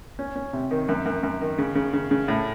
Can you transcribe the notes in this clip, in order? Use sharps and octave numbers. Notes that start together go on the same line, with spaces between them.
C#4
C#4
C3
D#3
F#2
F#2
F#2
D#3
C#3
C#3
C#3
C#3
A2